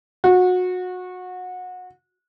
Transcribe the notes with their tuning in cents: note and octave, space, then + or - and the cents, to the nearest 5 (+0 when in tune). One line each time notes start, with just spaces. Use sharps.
F#4 -25